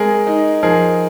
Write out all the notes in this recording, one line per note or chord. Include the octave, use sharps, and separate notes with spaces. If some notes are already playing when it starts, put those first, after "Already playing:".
Already playing: G#3 C4 G#4 A#4
D#4
F3 G#4 A#4